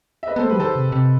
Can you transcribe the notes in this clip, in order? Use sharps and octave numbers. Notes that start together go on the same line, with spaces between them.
E5
B4 D#5
B3 A4 C5
A3
G4 B4
F#3
D#3 A4 C5
C3
C3